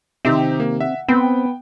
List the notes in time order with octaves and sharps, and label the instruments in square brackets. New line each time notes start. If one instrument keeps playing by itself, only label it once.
[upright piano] C3 D#3 [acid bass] C4 [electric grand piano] D#4 G4 E5
[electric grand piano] A#3
[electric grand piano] E5 [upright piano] F#5
[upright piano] B3 [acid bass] C4 [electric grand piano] G5